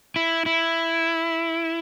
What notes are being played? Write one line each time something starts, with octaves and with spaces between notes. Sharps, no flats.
E4
E4